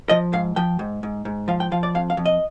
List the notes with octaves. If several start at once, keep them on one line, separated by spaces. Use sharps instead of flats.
F3 D#5
G#2 F5
F3 G5
G#2
G#2
G#2
F3 F5
G5
F3 F5
D5
F2 F5
F5
F2
D#5